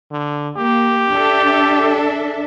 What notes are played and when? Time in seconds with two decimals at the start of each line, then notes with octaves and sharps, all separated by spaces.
0.11 D3
0.57 A#3 G4
1.12 D4 A4 E5